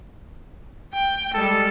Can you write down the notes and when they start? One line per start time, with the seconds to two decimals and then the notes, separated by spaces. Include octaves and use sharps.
0.93 G5
1.34 G3 G#3 A4